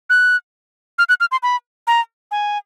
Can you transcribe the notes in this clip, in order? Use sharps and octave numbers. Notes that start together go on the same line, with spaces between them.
F#6
F6
F#6
F6
C6
B5
A#5
G#5